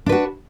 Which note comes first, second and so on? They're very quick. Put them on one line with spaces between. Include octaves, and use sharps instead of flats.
D4 B4 F#4